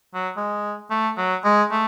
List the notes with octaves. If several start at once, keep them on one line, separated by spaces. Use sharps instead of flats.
F#3
G#3
A3
F#3
G#3
A3